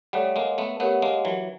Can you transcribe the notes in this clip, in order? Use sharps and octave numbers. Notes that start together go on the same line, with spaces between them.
G3 A3 A4 C#5 F#5
G#3 A#3
A3 B3
A3 B3 G4 A#4 C#5 F#5
G#3 A#3
E3 F#3